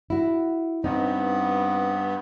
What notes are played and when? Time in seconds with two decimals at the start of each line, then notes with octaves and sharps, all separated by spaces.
0.10 E4 F#4
0.84 G2 B3 C4 D#4